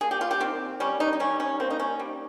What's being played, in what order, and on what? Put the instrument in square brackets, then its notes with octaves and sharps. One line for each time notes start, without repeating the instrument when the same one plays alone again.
[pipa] A#3 G#4
G4
F4
G4
D#3 C4
G3 C#4
D#4
D#4
G3 C#4
C#4
A#3 C4
D#4
C#4
G3